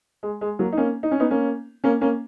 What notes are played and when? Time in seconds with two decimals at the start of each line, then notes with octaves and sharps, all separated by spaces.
0.23 G#3
0.41 G#3
0.59 F#3 A#3
0.73 D#4
0.77 A#3 C#4
1.03 D#4
1.11 C#4
1.20 B3 D#4
1.30 A#3 C#4
1.84 A#3 C#4
2.01 A#3 C#4